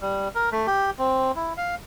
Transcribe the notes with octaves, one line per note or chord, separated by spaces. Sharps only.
G3
A#4
A3
G4
C4
E4
F5